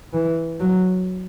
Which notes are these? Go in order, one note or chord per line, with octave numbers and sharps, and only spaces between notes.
E3
F#3